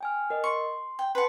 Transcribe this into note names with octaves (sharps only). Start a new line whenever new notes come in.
G5 G#5 F6
A#4 D#5
C6 C#6
G5
B4 F#5 A5 C6